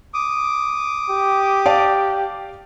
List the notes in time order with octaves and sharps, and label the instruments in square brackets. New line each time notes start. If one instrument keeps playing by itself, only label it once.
[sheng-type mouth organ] D6 D#6
[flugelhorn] G4
[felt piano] D5 F5 A5